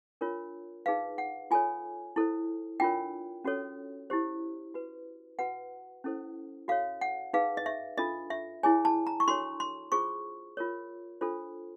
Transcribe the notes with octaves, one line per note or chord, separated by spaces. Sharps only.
D4 F4 A#4 C#5
D#4 G#4 B4 F5
F#5
F4 A4 C#5 G#5
E4 A4 C5
D4 F4 A#4 C#5 G5
C#4 F#4 A4 C#5
E4 G4 C5
F#4 B4
F#4 B4 F#5
C#4 E4 A4 C5
F#4 A4 C#5 F5
F#5
D#4 G#4 B4 F5
D#5
E5
D4 F4 A4 D#5
E5
E4 G#4 C#5 G#5
A5
A#5
C#6
D4 F#4 A4 C#5 C6
C6
F4 G#4 C5 C#6
F4 A#4 C#5
D4 F4 A4 C5